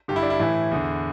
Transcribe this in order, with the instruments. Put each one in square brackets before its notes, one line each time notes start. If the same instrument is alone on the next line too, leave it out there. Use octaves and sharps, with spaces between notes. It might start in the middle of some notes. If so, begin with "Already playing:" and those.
[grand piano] G2 D3 G4
E4
D4
E4
A2 E3
E2 D3